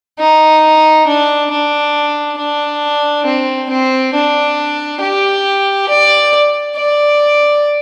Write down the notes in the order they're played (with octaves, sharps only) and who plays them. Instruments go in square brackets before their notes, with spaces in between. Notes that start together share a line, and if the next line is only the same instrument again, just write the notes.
[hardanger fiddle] D#4
D4
D4
D4
C4
C4
D4
G4
D5
D5